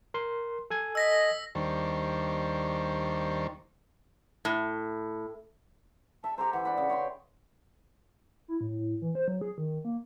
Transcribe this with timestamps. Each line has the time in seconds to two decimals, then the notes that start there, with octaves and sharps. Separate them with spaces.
0.14 A#4 C6
0.70 A4 G#5 G#6
0.95 D#5 E6 A#6 B6
1.55 D#2 D#3 G3 D4 C5 C#6
4.45 A2
6.24 E5 A5
6.38 G4 A4 C5 A#5
6.53 E3 F#5
6.65 D4 B5
6.77 C#3
6.90 C#5 G5 C6
8.48 E4
8.61 A2
8.78 A2
9.02 E3
9.15 C5
9.28 F#3
9.41 G#4
9.58 D#3
9.85 A#3